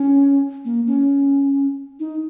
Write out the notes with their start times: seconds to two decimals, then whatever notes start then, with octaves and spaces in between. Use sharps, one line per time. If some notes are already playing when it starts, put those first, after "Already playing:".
Already playing: C#4
0.65 A#3
0.87 C#4
2.00 D#4